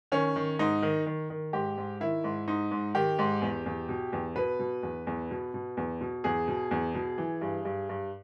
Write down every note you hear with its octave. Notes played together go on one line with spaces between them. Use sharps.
D#3 C#4
D#3
G#2 D#4
D#3
D#3
D#3
G#2 G4
G#2
D#3 E4
G#2
G#2 D#4
G#2
D#3 G4
G#2
E2
E2
B2
E2
B2 B4
B2
E2
E2
B2
B2
E2
B2
E2 G#4
B2
E2
B2
E3
G2
G2
G2